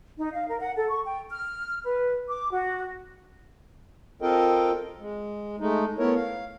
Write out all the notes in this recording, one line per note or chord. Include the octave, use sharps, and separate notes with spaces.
D#4
F5
A#4
F#5
A4
C#6
G5
F6
B4
D6
F#4
C4 F4 A4 A#4 D#5 G5
G#3
G#3 A3 D#4
A3 B3 E4 A#4 C#5
F5